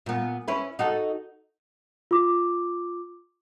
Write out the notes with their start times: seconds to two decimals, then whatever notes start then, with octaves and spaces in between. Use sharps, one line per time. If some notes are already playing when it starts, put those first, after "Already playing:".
0.06 A#2 B3
0.48 C#4 E4 B4
0.79 D#4 F#4 A4
2.11 F4 D6